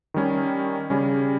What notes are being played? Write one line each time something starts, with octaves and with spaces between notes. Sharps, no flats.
D#3 G3 C#4
C#3 G3 C#4